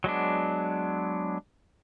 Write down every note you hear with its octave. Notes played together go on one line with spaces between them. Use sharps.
F#3 G#3 B3 D4